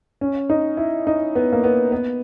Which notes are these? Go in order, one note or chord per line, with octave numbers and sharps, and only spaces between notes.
C#4
D#4
E4
D#4
B3
A#3
B3
B3